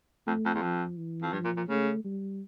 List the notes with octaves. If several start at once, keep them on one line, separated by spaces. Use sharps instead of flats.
F2 A3
F2
E2
F2 F3
E3
F2
G2 F3
A#2
A#2
C#3 A3
G3